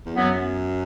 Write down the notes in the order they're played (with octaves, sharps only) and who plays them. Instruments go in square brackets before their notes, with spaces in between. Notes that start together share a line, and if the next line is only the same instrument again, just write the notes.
[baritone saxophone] E2
[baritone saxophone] F#2 [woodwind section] F#3 B3